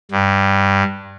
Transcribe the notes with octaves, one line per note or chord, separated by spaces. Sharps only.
G2